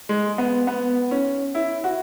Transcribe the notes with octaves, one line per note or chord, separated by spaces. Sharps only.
G#3
B3
B3
C#4
E4
F#4